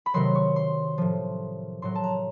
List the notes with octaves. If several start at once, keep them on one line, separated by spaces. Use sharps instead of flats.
B5
C3 D#3 F#3 C6
C#6
C6
A2 F3
A2 F#3 C6
A5
A#5